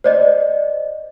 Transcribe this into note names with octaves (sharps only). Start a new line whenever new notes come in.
C5 D5 D#5